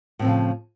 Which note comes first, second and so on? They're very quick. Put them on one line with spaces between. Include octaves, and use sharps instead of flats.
A2 C4 F3 C#3